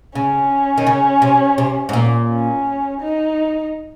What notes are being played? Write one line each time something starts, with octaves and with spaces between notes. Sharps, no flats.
C#3 C#4
D#3
C#3
C3
C3
G#2
A#2
C#4
D#4